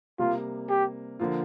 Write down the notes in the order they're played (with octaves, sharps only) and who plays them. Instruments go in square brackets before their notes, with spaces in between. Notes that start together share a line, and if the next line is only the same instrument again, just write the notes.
[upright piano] C3 G3 A#3 [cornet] F4
[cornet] G4
[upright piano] D3 F3 A#3 F4